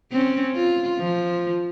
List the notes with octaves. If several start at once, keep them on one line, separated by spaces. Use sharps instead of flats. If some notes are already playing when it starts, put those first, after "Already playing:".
C4 C#4
F4
F3